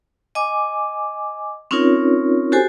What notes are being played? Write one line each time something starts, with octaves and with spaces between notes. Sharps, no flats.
D#5 G#5 D6
C4 C#4 D#4 F4 A#4 C#5
F#4 G4 A4 C5 G#5